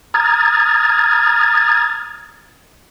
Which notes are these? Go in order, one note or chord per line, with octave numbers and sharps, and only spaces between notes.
A#5 D#6 F6 G#6 A6